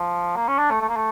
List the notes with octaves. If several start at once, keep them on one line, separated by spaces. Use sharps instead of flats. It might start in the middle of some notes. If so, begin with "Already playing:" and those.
Already playing: F3
A#3
C#4
D4
A3
A3
A#3
A3